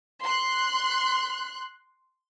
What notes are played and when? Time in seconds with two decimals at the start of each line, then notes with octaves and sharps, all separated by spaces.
0.24 C6 F#6